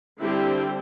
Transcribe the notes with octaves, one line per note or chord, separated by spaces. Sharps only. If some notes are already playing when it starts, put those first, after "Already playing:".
D3 G3 C4 E4 G4